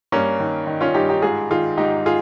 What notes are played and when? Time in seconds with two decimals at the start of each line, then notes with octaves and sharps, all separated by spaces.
0.12 G2 A#3 C#4
0.40 D#3
0.67 D#3
0.81 C#4 F4
0.94 G2 D#4 G4
1.09 D#4 G4
1.22 G#2 F4 G#4
1.50 D#3 F4 G#4
1.78 G#2 D#4 G4
2.06 F4 G#4